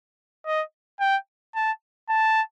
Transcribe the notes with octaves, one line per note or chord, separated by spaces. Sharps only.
D#5
G5
A5
A5